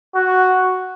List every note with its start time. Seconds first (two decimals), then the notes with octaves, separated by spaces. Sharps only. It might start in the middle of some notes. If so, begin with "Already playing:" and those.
0.16 F#4